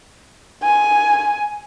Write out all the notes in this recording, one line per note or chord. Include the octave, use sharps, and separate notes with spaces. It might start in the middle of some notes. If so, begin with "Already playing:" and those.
G#5